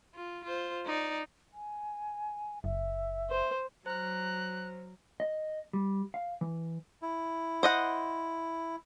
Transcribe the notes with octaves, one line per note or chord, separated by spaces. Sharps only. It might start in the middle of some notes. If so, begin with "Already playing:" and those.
F4
F4 C5
D#4 D5
G#5
F#1 E5
C5
F#3 C5 A#5 F6 F#6
D#5
G3
F5
E3
E4
C5 D#5 F#5